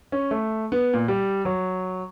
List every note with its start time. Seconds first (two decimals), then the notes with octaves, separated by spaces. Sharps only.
0.12 C#4
0.31 A3
0.72 B3
0.94 A#2
1.08 G3
1.45 F#3